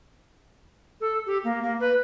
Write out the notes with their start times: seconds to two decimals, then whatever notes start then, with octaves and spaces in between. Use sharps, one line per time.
1.01 A4
1.26 G4
1.44 A#3
1.63 A#3
1.80 B4